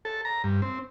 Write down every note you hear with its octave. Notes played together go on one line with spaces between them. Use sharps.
A4
A#5
G2
C4